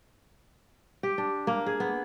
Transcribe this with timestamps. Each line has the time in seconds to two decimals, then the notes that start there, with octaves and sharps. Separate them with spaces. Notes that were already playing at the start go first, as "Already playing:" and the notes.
1.03 G4
1.18 D4
1.47 A#3
1.66 G#4
1.80 B3